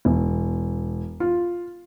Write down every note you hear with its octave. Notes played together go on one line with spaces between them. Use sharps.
E1
F4